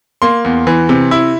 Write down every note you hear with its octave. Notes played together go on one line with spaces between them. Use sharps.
A#3 C6
E2
E3
C3
E4